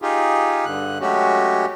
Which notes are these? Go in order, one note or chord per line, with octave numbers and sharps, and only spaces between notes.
D#4 F4 G4 G#4
G2 D3 F#6
F#3 G#3 A3 C#4 F#4 G4